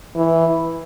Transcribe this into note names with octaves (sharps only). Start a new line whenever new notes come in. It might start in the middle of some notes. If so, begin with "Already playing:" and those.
E3